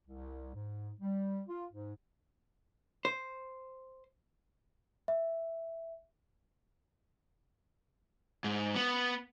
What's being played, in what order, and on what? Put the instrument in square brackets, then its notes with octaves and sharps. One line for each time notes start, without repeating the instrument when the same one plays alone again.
[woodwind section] C2
G#2
G3
F4
G#2
[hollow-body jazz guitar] C5
[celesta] E5
[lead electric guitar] G#2
B3